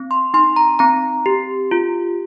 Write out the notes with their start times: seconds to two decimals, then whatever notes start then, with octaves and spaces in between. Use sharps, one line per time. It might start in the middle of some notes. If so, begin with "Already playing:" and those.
Already playing: C4
0.11 C6
0.34 D#4 C6
0.56 A#5
0.79 C4 A#5
1.26 G4
1.71 F4